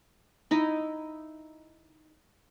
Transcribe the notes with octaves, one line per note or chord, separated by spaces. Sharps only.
D#4 E4 D#5